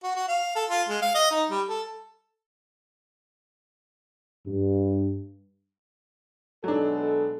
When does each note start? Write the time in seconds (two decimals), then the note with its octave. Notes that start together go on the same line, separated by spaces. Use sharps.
0.03 F#4
0.16 F#4
0.28 F5
0.55 A4
0.70 F4
0.89 G#3
1.02 F5
1.15 D#5
1.31 D#4
1.51 G3
1.69 A4
4.47 G2
6.64 B2 F#3 G#3 D4 A4